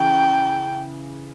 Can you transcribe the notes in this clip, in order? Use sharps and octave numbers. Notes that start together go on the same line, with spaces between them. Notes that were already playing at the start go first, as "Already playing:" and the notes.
Already playing: C#3 E3 G5